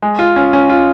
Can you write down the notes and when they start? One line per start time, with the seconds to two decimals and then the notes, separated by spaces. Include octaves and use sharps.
0.02 G#3
0.19 F4
0.36 C#4
0.53 C#4
0.69 F4